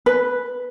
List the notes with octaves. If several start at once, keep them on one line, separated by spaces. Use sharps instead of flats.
B4